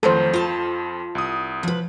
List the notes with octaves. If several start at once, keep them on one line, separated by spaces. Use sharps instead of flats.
F2 D#3 F3 F#3 A3 A4 C5
F4 A5
C2 D#6
F3 B4